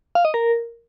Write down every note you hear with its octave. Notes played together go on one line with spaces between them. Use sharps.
F5
D#5
A#4